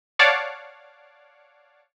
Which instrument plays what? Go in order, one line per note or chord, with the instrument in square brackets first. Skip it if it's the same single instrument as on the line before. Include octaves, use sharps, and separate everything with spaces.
[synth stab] C#5 D5 F5 F#5 A5 D6